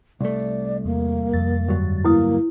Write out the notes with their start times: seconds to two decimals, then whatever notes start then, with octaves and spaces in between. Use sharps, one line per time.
0.21 C2 A3 D5
0.85 E2 A#3
1.33 F2 A6
1.68 D2 G2 F#3
2.04 A#3 E4 B4 D#6